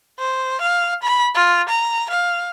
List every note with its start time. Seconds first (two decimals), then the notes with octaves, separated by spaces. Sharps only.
0.19 C5
0.61 F5
1.03 B5
1.35 F4
1.69 A#5
2.10 F5